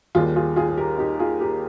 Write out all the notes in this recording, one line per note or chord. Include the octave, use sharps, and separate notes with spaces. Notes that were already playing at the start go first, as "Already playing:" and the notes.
D#2 D#3 G3 F4 G#4
F4 G#4
F4 G#4
G#4
G4 A#4
D#4 G4
F4 G#4
G4 A#4